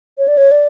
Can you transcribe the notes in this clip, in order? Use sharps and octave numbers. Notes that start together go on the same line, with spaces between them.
C#5
D5
C#5
D5